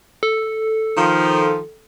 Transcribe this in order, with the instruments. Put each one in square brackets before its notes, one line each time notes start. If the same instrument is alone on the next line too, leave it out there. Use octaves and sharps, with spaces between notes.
[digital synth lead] A4
[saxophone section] D#3 F3